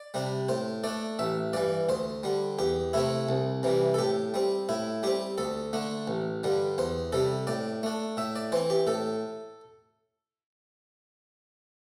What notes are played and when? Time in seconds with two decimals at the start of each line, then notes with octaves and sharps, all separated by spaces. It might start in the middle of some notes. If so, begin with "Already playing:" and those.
Already playing: D5
0.14 C3 G3 D4
0.49 A2 C5
0.84 A3 D4 D5
1.19 A1 E5
1.53 G2 E3 D5
1.89 D2 C5
2.23 D3 G3
2.59 E2 G4
2.93 C3 A3 C4 E4
3.29 C2
3.63 C3 E3 G3
3.94 A4
3.98 A2 G4
4.34 G3 C4
4.69 A2 E4
5.03 G3 C4 G4
5.38 D2 A4
5.73 D3 A3 D4
6.08 A1
6.44 G2 D3 G3
6.78 E2 C5
7.12 C3 G3 A4
7.47 A2 D5
7.83 A3 D4
8.17 A2 E5
8.36 D5
8.52 E3 C4 C5
8.70 G4
8.87 A2 A4